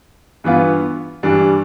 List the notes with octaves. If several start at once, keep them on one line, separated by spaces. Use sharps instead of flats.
G2 E3 B3 F4 B4
G2 E3 G3 D4